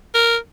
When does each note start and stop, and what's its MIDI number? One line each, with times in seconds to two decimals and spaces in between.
0.14 0.36 70